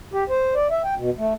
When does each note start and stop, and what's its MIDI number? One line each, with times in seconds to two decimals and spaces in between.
0.13 0.24 67
0.29 0.54 72
0.55 0.67 74
0.70 0.82 76
0.84 0.94 79
0.97 1.10 47
1.18 1.33 57